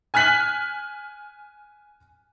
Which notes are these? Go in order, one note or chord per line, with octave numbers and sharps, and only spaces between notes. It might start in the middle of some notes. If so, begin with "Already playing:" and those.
G#5 F6 F#6 B6 F#7